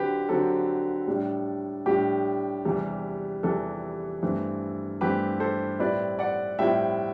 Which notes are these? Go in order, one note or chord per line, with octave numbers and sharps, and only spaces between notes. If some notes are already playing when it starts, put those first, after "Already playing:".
Already playing: D3 F#3 C4 G4 B4
D3 F#3 C4 A4
A2 G3 D4
A2 G3 D4 G4
E2 C3 E3 G3
E2 C3 E3 G3 A4
G2 E3 A3 C4
G2 E3 A3 C4 G4 B4
A4 C5
A2 G3 C4 E4 B4 D5
D5 F#5
A2 G3 C4 E4 E5 G5